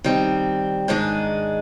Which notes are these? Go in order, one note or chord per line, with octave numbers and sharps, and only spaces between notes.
D#3 G3 C4
G#2 D#3 G#3 D4 G#4